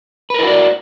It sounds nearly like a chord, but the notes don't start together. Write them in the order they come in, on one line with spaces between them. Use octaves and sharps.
B4 A#4 E4 F#4 D5